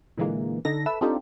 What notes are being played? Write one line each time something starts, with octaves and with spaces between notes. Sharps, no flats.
A#2 D3 E3 G#3 A#3
D3 D#4 A4 A#6
A4 B4 E5 E6
C4 D4 D#4 F4 G4 A4